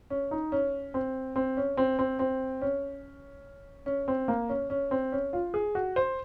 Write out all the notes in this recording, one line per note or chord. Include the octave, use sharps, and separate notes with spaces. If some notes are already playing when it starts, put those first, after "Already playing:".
C#4
D#4
C#4
C4
C4
C#4
C4
C4
C4
C#4
C#4
C4
A#3
C#4
C#4
C4
C#4
F4
G#4
F#4
C5